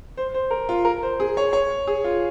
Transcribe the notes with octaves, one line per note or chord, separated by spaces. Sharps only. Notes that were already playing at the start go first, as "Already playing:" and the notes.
C5
C5
A#4
F4
A#4
C5
G#4
C#5
C#5
G#4
F4